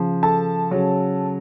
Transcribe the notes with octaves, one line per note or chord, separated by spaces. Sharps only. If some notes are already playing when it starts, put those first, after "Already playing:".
Already playing: C#3 F3
A4 A5
C#3 F#3